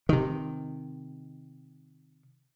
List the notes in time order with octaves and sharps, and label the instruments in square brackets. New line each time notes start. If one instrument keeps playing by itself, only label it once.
[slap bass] C3 D#3